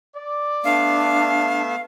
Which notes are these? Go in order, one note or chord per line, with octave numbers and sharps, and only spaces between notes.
D5
A3 B3 D4 E5 F5